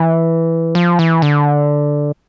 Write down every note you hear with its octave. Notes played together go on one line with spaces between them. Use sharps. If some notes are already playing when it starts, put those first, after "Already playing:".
Already playing: E3
F3
E3
D3